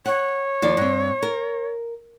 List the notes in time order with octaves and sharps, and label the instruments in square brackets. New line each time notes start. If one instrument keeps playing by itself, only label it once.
[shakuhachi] C#5 [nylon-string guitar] F#5
[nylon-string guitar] D#2 F3 D5
G2 C4
A#4